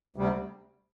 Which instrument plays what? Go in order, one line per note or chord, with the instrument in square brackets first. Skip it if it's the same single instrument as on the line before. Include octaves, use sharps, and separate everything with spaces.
[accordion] D2 C3 G3